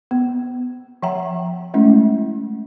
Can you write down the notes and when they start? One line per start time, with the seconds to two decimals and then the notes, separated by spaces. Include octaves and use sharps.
0.11 B3
1.03 F3 E5 F#5 G5 A#5
1.74 G#3 A3 C#4 E4